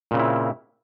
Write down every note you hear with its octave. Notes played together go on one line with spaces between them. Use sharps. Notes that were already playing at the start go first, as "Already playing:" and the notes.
A#2 C#3 C4 E4